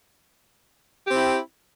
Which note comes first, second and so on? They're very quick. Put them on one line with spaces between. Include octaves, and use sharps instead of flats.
G4 C4 E4